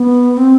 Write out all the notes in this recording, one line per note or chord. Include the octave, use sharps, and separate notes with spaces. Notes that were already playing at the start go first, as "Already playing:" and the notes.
Already playing: B3
C4